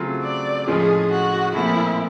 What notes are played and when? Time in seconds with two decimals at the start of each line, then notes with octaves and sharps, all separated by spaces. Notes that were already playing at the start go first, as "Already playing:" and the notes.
Already playing: C#3 F#3 A3 C4 F4
0.23 D5
0.67 A2 F3 G#3 C#4 F4 G#4
1.11 F#4
1.55 A#2 F3 A3 C4 E4